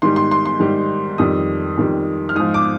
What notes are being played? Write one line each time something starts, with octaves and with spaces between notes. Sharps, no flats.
G#2 D#3 G3 C6
C6
C6
C6
G#2 D#3 G3
F2 D#3 G3 D#6
F2 D#3 G3
F6
G#2 F3 D#6
D6